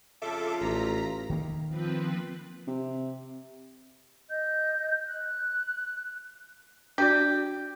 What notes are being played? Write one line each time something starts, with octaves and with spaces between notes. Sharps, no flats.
F2 C#3 F4 A4 E5 D6
A1 A#5 B6
D#3 A#3
F3 C4 B4
C3
D#5 G6
F#6
D4 F#4 G4 D5